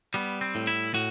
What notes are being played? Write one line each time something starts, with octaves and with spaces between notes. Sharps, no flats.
G3 B3
C4
A2
E4
A2 F#4